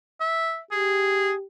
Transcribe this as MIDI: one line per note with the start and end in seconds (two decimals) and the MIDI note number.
0.20 0.59 76
0.71 1.44 67
0.71 1.33 68